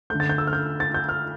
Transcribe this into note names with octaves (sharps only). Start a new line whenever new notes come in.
D3 A3 G6
A6
G6
E6
F6
G6
A6
G6
F6